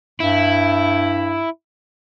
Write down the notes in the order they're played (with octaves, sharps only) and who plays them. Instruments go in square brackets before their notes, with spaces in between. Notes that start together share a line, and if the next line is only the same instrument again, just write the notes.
[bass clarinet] G2 [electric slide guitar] E4